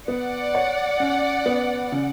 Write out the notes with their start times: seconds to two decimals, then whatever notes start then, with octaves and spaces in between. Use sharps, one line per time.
0.08 B3 D5 F#5
0.55 C#5
1.00 C#4
1.46 B3
1.92 C#3